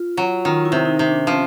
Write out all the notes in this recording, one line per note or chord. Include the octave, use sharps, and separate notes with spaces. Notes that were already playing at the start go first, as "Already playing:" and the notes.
Already playing: F4
F#3
D#3 F4
E4
C3
D#4
C3
D4
F3 C#4